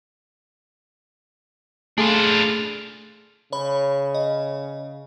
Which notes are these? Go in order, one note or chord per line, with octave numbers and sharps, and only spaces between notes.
A3 D4 F4 G#4
C#3 C#5 B5
D#5